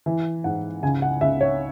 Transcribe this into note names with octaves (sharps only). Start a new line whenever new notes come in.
E3
G#2 F#5
C#2 G#5
F#5
C#2 E5
C#5